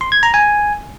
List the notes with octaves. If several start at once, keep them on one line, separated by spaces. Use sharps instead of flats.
C6
G#6
A#5
G#5